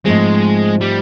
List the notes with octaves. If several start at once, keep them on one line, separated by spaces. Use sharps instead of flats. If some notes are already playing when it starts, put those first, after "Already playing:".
G#2 F3 G#3 A3 C4
G3